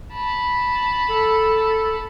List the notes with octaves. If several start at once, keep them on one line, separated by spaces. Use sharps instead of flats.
A5 B5
A4